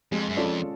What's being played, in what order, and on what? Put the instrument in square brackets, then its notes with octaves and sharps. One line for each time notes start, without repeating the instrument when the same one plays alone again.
[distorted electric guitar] F2 [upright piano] G#3
[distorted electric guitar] F#2
[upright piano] C#4 F4 A4 D5
[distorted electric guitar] F2